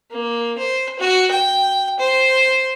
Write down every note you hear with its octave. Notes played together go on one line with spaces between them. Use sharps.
A#3
C5
F#4
G5
C5